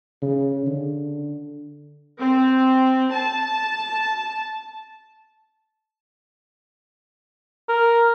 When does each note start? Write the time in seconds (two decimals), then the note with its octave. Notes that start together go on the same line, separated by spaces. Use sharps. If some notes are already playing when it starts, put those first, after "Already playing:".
0.22 C#3
0.67 D3
2.20 C4
3.13 A5
7.69 A#4